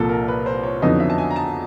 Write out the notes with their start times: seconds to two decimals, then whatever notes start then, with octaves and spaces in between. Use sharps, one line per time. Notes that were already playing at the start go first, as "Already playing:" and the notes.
Already playing: C2 A#2 F3 A#3 A4
0.09 A#4
0.28 B4
0.46 C5
0.63 C#5
0.82 F2 D3 F#3 B3 D#4 D#5
1.00 E5
1.10 A5
1.18 G#5
1.31 A#5
1.36 A5